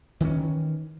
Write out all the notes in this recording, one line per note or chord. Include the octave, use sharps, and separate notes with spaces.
D#3 E3 A#3 C#4